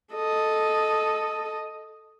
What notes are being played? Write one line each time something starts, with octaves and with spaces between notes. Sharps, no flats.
A4 D#5